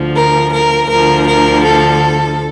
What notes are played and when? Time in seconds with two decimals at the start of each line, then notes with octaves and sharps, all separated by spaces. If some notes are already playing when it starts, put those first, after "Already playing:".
Already playing: D2 D3 F3
0.15 A#4
0.53 A#4
0.89 D2 D3 F3 A#4
1.26 A#4
1.64 A4